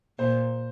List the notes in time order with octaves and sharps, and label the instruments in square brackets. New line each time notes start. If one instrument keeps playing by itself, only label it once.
[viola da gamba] A#2 [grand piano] C5